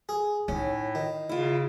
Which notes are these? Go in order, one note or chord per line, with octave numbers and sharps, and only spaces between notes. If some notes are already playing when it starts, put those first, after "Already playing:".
G#4
A2 C#4 D#4
D#3
C#3 E4 F4